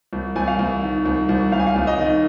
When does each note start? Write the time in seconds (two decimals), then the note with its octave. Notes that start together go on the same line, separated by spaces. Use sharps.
0.13 C2
0.36 C2 G#5
0.48 F5
0.59 C2
0.83 D#3
1.05 C2
1.29 C2
1.52 C2 F5
1.60 G#5
1.67 F5
1.76 C2
1.87 D#5
1.99 D#3